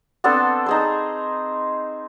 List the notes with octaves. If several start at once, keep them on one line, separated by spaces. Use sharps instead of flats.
B3 C4 D4 A4
D#4 G#4 C5